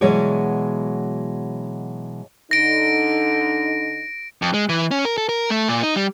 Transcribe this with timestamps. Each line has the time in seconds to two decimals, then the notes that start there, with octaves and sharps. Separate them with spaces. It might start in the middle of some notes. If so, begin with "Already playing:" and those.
0.01 B2 E3 F#3 G#3 C#5 D5
2.51 D3 D#4 A#6 D7
4.42 F2
4.54 G#3
4.69 E3
4.91 C#4
5.05 A#4
5.18 A4
5.29 A#4
5.50 A3
5.68 A#2
5.83 D#4
5.96 G3